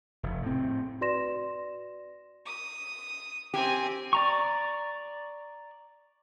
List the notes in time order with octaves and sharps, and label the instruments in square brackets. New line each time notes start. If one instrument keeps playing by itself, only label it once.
[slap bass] F1
A2 C4
[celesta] F#4 B4 D5 C6 A#6 E7
[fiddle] D#6
[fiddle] C4 G#5 [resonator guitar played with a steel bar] G4
[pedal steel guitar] D5 A#5 C#6